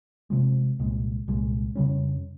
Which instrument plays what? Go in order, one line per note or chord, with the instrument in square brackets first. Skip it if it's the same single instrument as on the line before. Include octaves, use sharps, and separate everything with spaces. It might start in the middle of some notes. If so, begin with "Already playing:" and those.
[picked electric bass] C3 F3 G#3
C2 A#2 G#3
C2 A#2 G#3
F2 C#3 G3 C#4